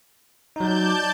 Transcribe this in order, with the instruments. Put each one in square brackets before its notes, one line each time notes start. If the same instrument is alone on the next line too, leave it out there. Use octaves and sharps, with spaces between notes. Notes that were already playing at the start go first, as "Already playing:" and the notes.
[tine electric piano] F#3 D#4 [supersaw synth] D5 A5 [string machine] G6